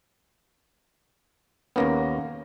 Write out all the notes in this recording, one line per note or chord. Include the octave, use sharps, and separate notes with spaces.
D#2 A#3 B3 C#4 A#6